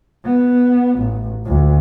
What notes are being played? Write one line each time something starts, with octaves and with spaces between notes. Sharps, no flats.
B3
A1
D2